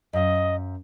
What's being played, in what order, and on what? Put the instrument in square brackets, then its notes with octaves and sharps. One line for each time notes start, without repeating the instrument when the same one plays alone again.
[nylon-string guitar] F#2 F5 [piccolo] D#5